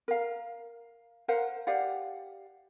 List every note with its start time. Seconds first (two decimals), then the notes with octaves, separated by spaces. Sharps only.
0.08 A#4 F5
1.28 A#4 C5 F5 F#5
1.67 G4 D5 F5 F#5